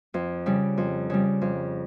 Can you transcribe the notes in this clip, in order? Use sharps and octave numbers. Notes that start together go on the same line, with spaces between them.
F2
C#3 G3
F2
C#3 G3
F2